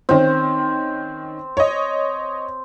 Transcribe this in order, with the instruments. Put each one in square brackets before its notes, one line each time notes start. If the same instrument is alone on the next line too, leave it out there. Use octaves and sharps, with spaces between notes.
[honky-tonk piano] D#3 C#4 [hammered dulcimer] C4
[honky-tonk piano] C#5 D#5